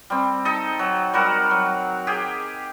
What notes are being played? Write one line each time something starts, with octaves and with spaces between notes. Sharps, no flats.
G3 C4
D#4 A4 D#5
F#3
G3 F#4 A#4
F#3
G4 G#4